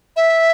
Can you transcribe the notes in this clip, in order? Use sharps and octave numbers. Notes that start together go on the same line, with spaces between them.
E5